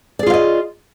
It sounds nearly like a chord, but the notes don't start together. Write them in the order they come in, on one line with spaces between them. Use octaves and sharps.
D5 G#4 F4 F5 D#5